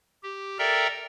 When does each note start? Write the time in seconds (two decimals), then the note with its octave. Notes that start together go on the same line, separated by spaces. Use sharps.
0.23 G4
0.59 A4 A#4 D5 E5 G5 A#5